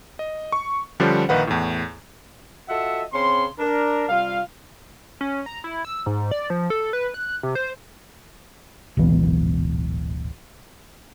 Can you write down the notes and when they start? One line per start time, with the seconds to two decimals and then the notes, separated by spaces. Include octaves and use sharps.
0.19 D#5
0.52 C#6
1.00 D3 F3 G3 C#4 D4 C5
1.29 A#1 D#3 D#4 B4 F5 F#5
1.47 E2 A2
2.69 F4 F#4 A4 D#5 E5 F#5
3.13 C#3 C4 C#4 C6
3.59 D4 A#4
4.09 C3 G3 F4 F5
5.21 C#4
5.46 A#5
5.64 E4
5.85 E6
6.06 G#2
6.31 D5
6.50 F3
6.70 A4
6.93 B4
7.14 F#6
7.43 C3
7.55 C5
8.97 D1 G#1 B2 E3